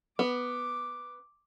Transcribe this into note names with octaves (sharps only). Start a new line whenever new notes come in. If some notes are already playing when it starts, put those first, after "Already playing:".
B3 D6